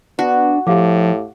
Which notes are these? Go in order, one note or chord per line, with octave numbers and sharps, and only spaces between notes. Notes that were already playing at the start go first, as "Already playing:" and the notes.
B3 D4 F#4
A2 F3 G4 F5 D6